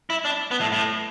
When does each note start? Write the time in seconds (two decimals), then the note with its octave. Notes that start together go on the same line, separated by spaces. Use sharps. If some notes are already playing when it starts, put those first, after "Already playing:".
0.10 E4
0.25 D4
0.51 B3
0.61 A2
0.72 A2